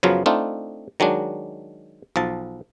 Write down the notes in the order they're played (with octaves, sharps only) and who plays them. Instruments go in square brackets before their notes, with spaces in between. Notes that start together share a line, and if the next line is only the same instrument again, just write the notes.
[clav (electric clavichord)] F#2 C#3 F3 F#3 B3 F4
A3 C4 D4 D#4 F4
D#3 F#3 G#3 D4
B1 F3 A5